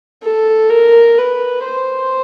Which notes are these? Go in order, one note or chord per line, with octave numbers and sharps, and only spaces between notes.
A4
A#4
B4
C5